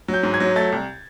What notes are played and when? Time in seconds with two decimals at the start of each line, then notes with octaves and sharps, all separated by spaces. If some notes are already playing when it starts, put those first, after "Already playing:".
0.08 F#3
0.14 G6
0.23 G#2
0.34 G#6
0.40 F#3
0.56 A3 A6
0.72 C2